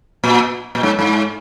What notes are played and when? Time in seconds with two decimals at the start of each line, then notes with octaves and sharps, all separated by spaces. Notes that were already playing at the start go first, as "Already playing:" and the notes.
0.24 A#2
0.75 A#2
0.83 G#2
0.99 G#2